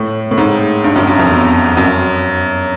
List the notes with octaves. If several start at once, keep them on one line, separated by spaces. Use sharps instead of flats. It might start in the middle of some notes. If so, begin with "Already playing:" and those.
Already playing: A2
A2
G#2
G2
F#2
F#2
F2
E2
F#2